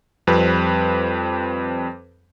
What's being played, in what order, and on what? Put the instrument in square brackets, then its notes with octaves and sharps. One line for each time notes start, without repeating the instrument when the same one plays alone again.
[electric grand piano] F2 G3 C4 B4